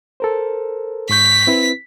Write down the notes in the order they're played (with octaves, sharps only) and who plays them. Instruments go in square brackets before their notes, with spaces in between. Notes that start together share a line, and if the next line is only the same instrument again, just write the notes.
[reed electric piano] A4 A#4 C5
[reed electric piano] G#2 C#6 G6 [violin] B6
[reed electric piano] C4 E4 B4